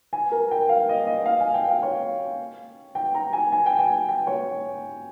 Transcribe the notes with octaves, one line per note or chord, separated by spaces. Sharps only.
G#5
A#4
G5
F5
D#5
D#5
F5
G#5
G5
F5
C#5
G5
A#5
G#5
G#5
G5
G#5
G5
C#5